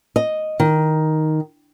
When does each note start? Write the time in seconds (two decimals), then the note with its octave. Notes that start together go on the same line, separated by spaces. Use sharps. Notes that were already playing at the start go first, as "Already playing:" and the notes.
0.16 D#5
0.60 D#3